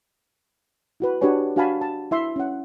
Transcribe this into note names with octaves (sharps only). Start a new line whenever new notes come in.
E4 F#4 B4
D4 F#4 G4 B4 C#5 G#5
D4 F#4 F5 G#5 A5 B5
A5
E4 E5 C6
C#4 F#5